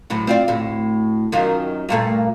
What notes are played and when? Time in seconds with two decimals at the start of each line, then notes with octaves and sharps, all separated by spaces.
0.10 D2 A2 F#3
0.27 C4 F4 D5
0.48 D2 A2
1.32 F#2 D#3 F4
1.89 G2 A#2 A3